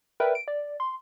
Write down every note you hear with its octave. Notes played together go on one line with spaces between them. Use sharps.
A#4 B4 D5 E5 G5
D7
D5
C6